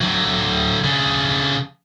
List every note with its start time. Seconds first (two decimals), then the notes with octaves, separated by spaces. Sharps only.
0.01 D3 F#3
0.84 C#3 D4